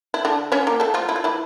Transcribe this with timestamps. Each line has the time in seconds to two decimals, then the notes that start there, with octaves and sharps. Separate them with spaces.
0.14 E4
0.25 D3 D4
0.52 C#4 C#5
0.67 A#3 A#4
0.80 A3 A4
0.94 F3 F4
1.09 E4
1.16 F4
1.24 E3 E4